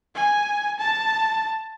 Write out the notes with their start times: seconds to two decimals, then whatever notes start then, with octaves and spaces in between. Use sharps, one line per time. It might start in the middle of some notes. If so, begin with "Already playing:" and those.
0.15 G#5
0.79 A5